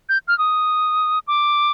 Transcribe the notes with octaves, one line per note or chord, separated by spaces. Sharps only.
G6
F6
D#6
D6